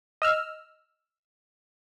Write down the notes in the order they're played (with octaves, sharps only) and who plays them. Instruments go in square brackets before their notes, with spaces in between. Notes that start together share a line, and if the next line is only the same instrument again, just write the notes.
[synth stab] D#5 E6 F6